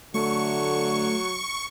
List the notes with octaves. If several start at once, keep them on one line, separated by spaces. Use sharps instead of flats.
D3 F#3 A3 C#6